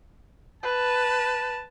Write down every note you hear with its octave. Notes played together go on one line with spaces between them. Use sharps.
B4 A5